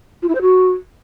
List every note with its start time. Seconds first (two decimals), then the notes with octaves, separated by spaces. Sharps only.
0.22 F4
0.28 E4
0.35 C5
0.41 F#4